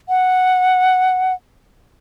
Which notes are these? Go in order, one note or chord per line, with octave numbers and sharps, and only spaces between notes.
F#5